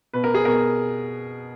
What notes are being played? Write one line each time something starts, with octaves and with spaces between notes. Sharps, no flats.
B2 B4
A#4
G#4
B2 A#4